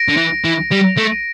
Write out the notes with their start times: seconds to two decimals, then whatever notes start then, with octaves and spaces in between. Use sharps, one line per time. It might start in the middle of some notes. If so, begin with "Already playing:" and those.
Already playing: A#6 D7
0.09 D3
0.17 E3
0.44 E3
0.71 G3
0.97 A3